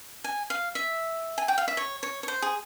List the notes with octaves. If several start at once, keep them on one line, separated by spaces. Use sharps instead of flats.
G#5
F5
E5
G#5
G5
F5
E5
C#5
C#5
C#5
C5
G#4